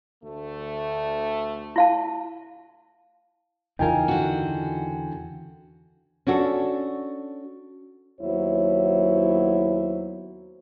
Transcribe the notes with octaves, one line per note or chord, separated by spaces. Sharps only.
D2 A3
E4 F5 A5
E2 C#3 E3 D#4 F4 A#4 G5 G#5
D3 F#4
C#4 D4 F#4 A4
D#2 F#3 B3 E4 C5 C#5